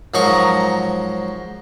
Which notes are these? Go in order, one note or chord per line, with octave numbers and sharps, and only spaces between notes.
G#2 F3 F#3 A#4 D#5 C#6